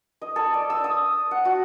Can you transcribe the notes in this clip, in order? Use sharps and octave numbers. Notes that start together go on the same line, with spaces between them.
D#5
A4
D5
E6
D#6
F#5
F#4